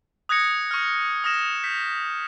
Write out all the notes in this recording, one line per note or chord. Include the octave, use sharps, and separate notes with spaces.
D#6 F#6 G#6 A#6 C#7
C#6 F6
D#6 F6 A#6 E7
G6 B6